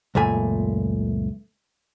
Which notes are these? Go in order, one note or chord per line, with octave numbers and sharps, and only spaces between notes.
C#2 F#2 A#2 A3 G#5